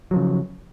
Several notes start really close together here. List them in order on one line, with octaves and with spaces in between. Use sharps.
F#3 F3 C#3